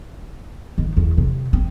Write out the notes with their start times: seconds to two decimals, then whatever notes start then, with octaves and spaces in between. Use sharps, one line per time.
0.78 D#3
0.97 E2
1.18 C3
1.53 C4